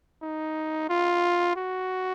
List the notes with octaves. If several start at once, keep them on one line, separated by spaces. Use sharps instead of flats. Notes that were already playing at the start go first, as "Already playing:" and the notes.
D#4
F4
F#4